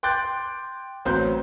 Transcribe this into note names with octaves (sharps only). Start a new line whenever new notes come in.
G5 C6 D6 F#6 G6 A6
A1 F#3 C4 B4 C5 G6